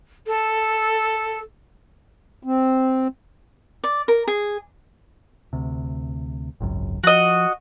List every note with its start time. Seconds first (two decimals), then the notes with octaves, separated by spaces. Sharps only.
0.27 A4
2.43 C4
3.84 D5
4.08 A#4
4.27 G#4
5.53 D2 C3
6.61 G#1 C#2 F#2
7.04 F3 F#4 D#5